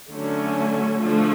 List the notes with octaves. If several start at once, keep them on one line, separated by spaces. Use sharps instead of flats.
D3 F#3 A3 C#4
D3 F3 A3 F4